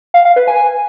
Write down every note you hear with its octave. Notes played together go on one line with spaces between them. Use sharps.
F5
F5
B4
G#5